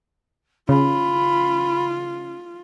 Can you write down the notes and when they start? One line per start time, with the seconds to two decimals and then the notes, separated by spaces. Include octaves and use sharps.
0.69 C#3 F4 B5